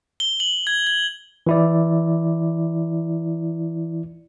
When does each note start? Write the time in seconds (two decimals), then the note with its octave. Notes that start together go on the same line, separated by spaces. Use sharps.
0.20 G7
0.40 F#7
0.67 G#6
0.87 G#6
1.47 E3 E4 D5